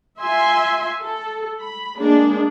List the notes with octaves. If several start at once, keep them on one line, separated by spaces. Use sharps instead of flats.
F4 E5 G#5 C6
A4
B5
G#3 A#3 D4 G#4